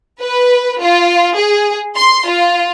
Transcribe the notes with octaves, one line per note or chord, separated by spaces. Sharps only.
B4
F4
G#4
C6
F4